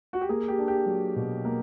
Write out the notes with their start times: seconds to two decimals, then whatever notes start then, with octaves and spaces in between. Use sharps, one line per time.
0.13 F#4
0.21 G4
0.29 A#3 G#4
0.48 G4
0.58 D4
0.68 G4
0.86 F#3
1.16 B2
1.45 A#3